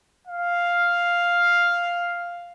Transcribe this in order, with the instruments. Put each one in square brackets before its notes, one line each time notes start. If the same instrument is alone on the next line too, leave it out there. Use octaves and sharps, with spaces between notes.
[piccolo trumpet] F5